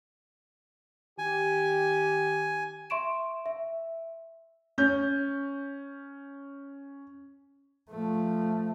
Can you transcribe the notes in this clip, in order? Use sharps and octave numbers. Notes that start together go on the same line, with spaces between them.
D#3 G4 G#5
E5 C6 C#6 D7 E7
E5
C#4 G6
F3 A3